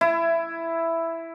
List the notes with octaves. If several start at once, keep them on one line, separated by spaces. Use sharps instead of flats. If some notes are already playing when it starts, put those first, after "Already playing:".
E4